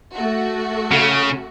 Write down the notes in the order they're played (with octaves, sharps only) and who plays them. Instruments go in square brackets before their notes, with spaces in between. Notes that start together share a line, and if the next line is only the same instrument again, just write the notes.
[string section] A3 F#4
[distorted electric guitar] C#3